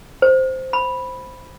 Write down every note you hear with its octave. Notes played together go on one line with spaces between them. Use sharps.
C5
B5